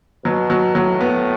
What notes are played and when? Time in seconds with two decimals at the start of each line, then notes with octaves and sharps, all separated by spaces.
0.25 B2 F#3
0.50 F#3
0.75 A2 F#3
1.01 B3